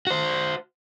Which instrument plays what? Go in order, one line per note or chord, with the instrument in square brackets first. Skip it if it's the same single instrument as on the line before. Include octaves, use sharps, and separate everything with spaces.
[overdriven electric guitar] F#4 C5